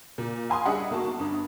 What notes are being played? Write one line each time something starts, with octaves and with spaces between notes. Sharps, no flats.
A#2
F5 G#5 C6 D#6
G3 D4 G#4 D#5 E5 F#5
B1 A#3 F#4 A5 C#6
G1 G2 D#6